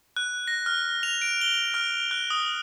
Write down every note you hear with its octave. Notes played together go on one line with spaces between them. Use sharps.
F#6
A#6
F6
F7
D7
G7
F6
F#6
D#6